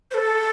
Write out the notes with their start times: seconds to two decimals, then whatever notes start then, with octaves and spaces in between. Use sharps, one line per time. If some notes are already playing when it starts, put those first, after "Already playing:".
0.11 C5
0.14 A4